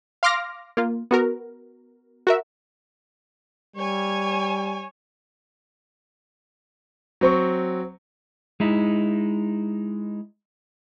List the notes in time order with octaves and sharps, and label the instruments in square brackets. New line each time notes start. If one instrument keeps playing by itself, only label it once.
[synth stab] F5 C6 D6 F6 A#6
A#3 F4
B3 F#4 A#4
F#4 A#4 E5
[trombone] G3 [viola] C#5 G#5
[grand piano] F#3 C4 C#6
[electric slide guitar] G#3 D#4 E4